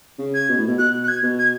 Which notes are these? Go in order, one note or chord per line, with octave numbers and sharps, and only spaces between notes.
C#3
G#6
B2
A2
B2
B2 F#6
F#6
G#6
B2
G#6